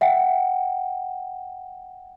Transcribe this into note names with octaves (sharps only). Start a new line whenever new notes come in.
E5 F#5 G5